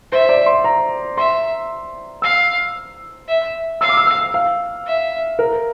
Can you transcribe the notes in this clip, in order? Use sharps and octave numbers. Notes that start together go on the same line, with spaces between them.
C5 E5
D5
C6
A#5
E5 C6
F5 E6
E5
F5 E6
D6
E6
E6
F5
E5
A#4